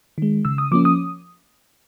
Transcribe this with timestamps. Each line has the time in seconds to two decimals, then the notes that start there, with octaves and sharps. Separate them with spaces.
0.18 D#3 G#3
0.45 C#3 E6
0.58 D#6
0.72 F3 A#3 C#4 D6
0.85 D#6